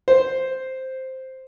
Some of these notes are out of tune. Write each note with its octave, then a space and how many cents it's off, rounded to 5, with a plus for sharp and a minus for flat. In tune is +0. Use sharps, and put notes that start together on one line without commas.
C5 +0